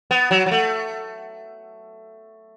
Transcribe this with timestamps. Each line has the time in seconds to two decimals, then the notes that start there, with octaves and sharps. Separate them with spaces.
0.11 B3
0.31 F#3
0.46 F#3
0.51 A3